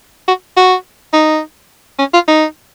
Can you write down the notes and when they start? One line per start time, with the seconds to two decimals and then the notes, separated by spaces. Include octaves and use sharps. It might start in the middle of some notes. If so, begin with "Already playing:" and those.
0.28 F#4
0.57 F#4
1.13 D#4
1.99 C#4
2.14 F4
2.28 D#4